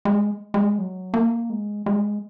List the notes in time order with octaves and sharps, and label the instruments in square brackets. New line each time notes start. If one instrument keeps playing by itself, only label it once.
[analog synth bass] G#3
G#3
F#3
A#3
G#3
G#3